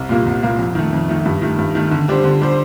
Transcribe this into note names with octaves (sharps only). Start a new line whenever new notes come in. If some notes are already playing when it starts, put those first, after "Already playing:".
Already playing: C2
A#2 G3 A#3
C2
A#2 G3 A#3
F2
D#3 A3
F2
D#3 A3
G2
D#3 A3
G2
D#3 A3
D3
G3 D4 G4 C5
D3
G3 D4 G4 C5